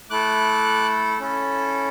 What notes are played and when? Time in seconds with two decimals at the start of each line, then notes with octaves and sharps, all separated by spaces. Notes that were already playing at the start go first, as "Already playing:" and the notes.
0.10 A3 E4 A4 D6 F#6
1.20 C#4 E4 A4